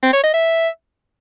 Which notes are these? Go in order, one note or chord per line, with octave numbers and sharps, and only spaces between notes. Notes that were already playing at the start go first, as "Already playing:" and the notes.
C4
C#5
D#5
E5